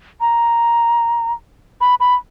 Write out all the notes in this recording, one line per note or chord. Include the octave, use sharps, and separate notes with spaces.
A#5
B5
B5